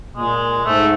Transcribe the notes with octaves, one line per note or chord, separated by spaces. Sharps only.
A#2 G#3
G#2 A3